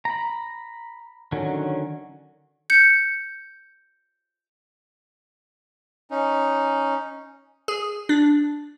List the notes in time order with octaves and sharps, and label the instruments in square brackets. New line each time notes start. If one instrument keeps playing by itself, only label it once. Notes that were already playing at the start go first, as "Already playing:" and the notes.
[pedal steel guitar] A#5 B5
D3 D#3 F#3 C#4
[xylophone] G6 C#7
[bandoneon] C#4 D#4
[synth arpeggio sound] G#4
D4